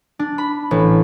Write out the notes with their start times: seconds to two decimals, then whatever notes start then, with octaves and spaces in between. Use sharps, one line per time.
0.19 D4
0.38 B5
0.71 A1